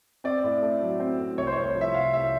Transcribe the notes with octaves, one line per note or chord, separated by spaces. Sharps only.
C4 D5
A2
A3
F#3
C4
A2
C2 C#5
C5
C2 C#5
F3
E5
C3 F5
C2 E5